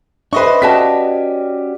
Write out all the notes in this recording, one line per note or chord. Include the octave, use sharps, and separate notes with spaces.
D4 B4 C5 D#5 E5 C#6
C#4 F#4 G4 B4 D5 D#5 A5 B6